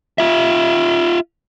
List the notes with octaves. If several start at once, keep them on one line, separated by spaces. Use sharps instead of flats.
F4 E5